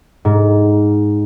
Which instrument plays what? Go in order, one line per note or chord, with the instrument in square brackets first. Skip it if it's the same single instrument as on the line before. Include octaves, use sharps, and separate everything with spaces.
[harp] G#2